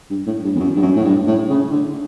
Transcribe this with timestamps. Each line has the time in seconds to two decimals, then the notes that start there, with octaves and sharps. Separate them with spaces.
0.10 G2
0.26 A2
0.44 G2
0.55 E2
0.60 F#2
0.76 G2
0.82 F#2
0.96 A2
1.04 G2
1.27 A2
1.50 C#3
1.71 D3